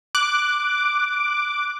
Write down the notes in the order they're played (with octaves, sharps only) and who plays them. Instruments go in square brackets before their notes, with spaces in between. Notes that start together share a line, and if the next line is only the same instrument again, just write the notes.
[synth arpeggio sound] D6 F#6